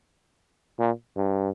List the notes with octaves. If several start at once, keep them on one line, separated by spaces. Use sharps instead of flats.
A#2
G2